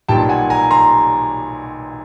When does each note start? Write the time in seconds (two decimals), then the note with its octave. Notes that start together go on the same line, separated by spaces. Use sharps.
0.08 B1 A#2 G3 G5 A5
0.29 F#5 G#5
0.50 G#5 A#5
0.71 A#5 C6